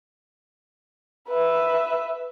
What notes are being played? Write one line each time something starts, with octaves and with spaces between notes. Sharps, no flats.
B4 E5